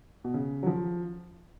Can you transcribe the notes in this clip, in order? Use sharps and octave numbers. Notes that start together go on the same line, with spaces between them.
B2
C#3
F#3
F3